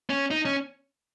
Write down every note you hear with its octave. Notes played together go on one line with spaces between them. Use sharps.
C#4
D#4
C#4